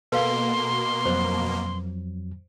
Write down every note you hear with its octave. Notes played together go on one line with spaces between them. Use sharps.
B2 A#3 A4 B4 F5 C6
F2 F#3 C5